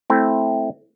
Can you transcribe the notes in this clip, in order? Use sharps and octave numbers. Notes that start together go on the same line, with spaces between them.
A3 C4 E4